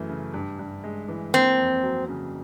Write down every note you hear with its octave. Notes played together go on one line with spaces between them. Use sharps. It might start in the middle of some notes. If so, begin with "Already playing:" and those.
Already playing: F#2 E3 A3
C#3
G2
G2
G#3
E3
A#3 C4
F2
F#3
C#3